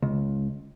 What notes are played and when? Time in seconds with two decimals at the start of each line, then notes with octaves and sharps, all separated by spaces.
0.02 C#2